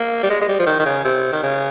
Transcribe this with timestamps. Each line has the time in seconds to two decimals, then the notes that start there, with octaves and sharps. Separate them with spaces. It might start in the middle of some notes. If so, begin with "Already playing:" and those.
Already playing: A#3
0.23 G3
0.30 G#3
0.41 G#3
0.48 G3
0.59 F3
0.66 D#3
0.79 D#3
0.85 C#3
1.05 C3
1.32 D#3
1.43 C#3